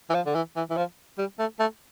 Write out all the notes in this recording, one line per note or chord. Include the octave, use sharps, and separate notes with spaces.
E3
F3
D3
E3
E3
E3
F3
G3
A3
A3